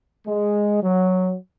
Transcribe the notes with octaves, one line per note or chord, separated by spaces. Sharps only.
G#3
F#3